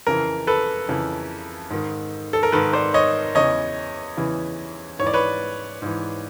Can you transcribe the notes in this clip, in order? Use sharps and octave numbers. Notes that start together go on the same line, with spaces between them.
F2 C#3 E3 A#4
A4 B4
F2 C#3 E3
G#2 D#3
A4
A#4
G#2 D#3 A4 B4
C5 D5
C#5 D#5
E2 C#3 E3 C#5 D#5
E2 C#3 E3
G#2 E3 C#5 D5
B4 C#5
G#2 E3